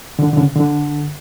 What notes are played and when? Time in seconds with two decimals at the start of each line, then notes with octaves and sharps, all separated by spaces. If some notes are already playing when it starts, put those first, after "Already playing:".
0.19 D3
0.33 D3
0.37 C#3
0.56 D3